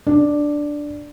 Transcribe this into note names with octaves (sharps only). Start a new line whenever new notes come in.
D4